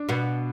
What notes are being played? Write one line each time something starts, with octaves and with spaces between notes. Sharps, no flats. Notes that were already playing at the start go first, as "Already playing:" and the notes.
Already playing: D4
B2 B3